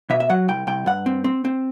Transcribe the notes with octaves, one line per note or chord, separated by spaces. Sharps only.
B2 E5
E5
F#3 F#5
C2 G5
C2 G5
G2 F#5
C4
C4
C4